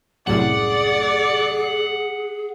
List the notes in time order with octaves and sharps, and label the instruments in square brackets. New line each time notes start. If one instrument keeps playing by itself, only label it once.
[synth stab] C2 F#2 A2 [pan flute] G#4 [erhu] D5 [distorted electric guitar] F#5